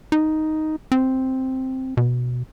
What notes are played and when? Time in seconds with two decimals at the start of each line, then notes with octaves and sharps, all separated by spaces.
0.12 D#4
0.92 C4
1.97 B2